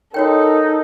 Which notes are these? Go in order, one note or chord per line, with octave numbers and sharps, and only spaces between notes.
D#4 F#4 A4 A#4 C#5 G5